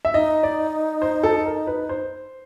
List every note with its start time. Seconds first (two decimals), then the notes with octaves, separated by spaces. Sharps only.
0.05 E5
0.14 D#4 D#5
0.43 D5
1.02 C5
1.23 A4
1.46 A#4
1.67 B4
1.89 C5